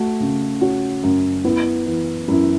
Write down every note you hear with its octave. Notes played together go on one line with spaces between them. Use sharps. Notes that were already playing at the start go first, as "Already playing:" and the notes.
Already playing: A3 F#4
C#3
C#4 F#4
F#2
B3 E4
E3
F#2 E4